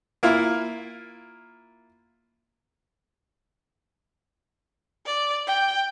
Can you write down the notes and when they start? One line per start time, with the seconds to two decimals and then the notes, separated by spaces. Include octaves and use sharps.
0.23 A#3 E4 F4 F6
5.06 D5
5.47 G5